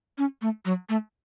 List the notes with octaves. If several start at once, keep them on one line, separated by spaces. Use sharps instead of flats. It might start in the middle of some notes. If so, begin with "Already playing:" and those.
C#4
A3
F#3
A3